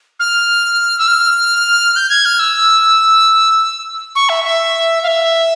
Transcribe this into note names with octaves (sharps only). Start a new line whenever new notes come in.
F6
E6
F6
G6
G#6
F6
E6
C#6
E5
E5
F5
E5